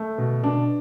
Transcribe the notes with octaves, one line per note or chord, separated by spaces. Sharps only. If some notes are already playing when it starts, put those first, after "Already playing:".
Already playing: A3
B2
B2 D4